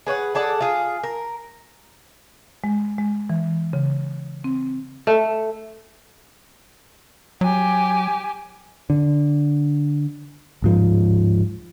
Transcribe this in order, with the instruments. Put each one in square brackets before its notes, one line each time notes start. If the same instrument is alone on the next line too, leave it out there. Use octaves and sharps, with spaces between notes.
[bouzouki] G#4 B4 C#5 F#5
G#4 A4 D5 F#5
F4 G#4
A#4
[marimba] G#3
G#3
E3
C#3
C4
[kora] A3
[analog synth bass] F#3 [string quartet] G4 G#5
[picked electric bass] D3
D1 G#2 F3